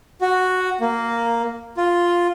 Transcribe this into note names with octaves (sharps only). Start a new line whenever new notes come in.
F#4
A#3
F4